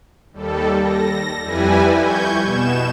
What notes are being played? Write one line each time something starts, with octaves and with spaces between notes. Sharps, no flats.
D#2 G3 A4
A#6
F2 G3 E4 B4 G#5
C#6 G6 G#6
B2 E7